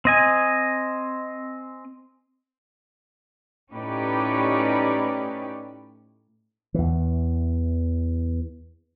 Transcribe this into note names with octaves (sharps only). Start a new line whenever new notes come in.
C4 D#5 G#5
A2 C#4 D#4 G4 B4 D5
E2 E3